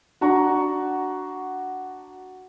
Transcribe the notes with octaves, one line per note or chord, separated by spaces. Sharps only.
D4 F#4 A#5 C#6